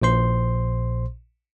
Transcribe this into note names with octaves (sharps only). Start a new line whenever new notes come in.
A#1 A#2 C5 C6